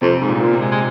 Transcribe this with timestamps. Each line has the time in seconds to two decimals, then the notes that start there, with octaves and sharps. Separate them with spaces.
0.01 F2 C3
0.21 G#2
0.28 A#2
0.34 G#2
0.40 A#2
0.53 C3
0.60 G#3
0.72 G#3